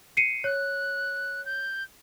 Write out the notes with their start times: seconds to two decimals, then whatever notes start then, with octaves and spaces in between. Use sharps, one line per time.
0.17 C7 C#7 D#7
0.44 C#5 F#6
1.45 G6